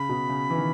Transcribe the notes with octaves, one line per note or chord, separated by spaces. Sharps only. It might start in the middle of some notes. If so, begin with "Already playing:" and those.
Already playing: C#3 B5
B2
C#3
E3
D#3